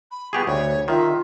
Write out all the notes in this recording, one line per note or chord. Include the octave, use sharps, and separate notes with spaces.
B5
B3 G4 G#4 C#6
D2 C#5
D#3 F4 E5